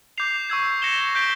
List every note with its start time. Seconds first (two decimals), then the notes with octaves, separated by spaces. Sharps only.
0.18 D6 G6 C7 F7
0.50 C#6 E6 G#6
0.82 G6 A#6 C#7 E7 G7
1.15 G6 B6 D7 G7